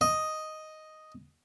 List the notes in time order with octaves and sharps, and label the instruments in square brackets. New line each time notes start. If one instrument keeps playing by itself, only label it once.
[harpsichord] D#5